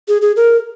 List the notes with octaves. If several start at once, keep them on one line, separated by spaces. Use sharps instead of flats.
G#4
G#4
A#4